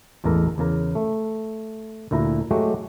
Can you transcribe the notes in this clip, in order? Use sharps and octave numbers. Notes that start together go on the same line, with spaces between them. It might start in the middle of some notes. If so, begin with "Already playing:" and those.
A1 E2 G#3 A4 A#4
E2 C#3 A#4
A3
D2 A#2 E4 A#5
F#3 G#3 A3 F#4 G4